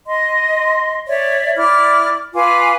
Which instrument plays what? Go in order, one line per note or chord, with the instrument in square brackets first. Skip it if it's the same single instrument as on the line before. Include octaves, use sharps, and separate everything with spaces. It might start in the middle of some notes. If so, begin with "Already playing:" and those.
[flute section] D#5 C6
C#5 D5 E5
E4 D5 D6 F6
F4 B4 G#5 D6